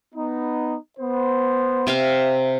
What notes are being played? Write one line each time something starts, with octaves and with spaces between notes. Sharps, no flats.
B3 D#4
B3 C5
C3 E5 F5